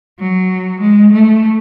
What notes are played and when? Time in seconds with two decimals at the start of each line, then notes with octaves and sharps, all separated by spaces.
0.19 F#3
0.80 G#3
1.12 A3